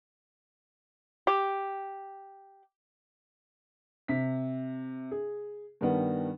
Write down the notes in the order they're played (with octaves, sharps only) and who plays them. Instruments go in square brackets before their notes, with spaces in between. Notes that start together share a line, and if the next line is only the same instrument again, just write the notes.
[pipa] G4
[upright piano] C3 B6
G#4
G2 D#3 G3 B3 D4